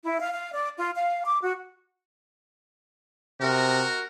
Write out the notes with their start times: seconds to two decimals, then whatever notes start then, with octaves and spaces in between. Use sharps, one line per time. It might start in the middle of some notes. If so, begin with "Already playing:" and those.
0.05 E4
0.20 F5
0.32 F5
0.53 D5
0.77 F4
0.95 F5
1.24 D6
1.42 F#4
3.41 C3 F#4 A#4